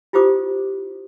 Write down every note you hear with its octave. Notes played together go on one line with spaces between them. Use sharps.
E4 F4 G4 C5 D6 D#6